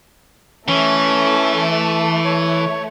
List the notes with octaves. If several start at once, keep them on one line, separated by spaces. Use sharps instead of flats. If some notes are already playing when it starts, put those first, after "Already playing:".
E3 A3 C#4
C#5